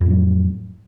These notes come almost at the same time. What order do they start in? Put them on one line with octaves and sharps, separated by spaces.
F2 A2 F#3